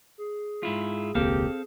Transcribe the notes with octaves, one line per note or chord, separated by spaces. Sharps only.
G#4
G#2 E4 F4
E1 C#2 A#3 C4 G4 A4 F5